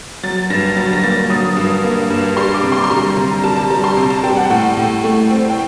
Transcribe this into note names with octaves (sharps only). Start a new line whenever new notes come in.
F#3 A6
G2 A#6
F#3 A6
A#6
A#3 A6
F#3 D#6
G2
A#3
G2
G3 C6
D6
C3
C6
C6
G3 A#5
C3 A#5
G3 A5
A5
G3 A#5
C6
C3 A#5
A5
G3 G5
F#5
A2 G5
A2
A3
C4
G5